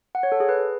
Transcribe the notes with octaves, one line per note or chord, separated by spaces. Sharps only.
F#5
C#5
A4
G#4
B4